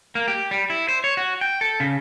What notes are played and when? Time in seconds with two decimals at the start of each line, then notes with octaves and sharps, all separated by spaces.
0.15 A#3
0.28 G4
0.51 G3
0.70 E4
0.88 C5
1.04 C#5
1.17 F#4
1.41 G5
1.61 A4
1.80 C#3